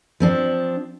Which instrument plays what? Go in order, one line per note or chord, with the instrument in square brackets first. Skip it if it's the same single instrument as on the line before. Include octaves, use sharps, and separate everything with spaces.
[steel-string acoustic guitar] F3 C4 D4